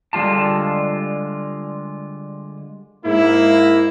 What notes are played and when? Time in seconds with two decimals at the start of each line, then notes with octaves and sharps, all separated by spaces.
0.13 D3 G3 G#3 F4 A5
3.05 G#2 A#3 E4